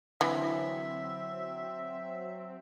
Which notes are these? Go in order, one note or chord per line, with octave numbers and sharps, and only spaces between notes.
D3 E3 F#3 C4 E5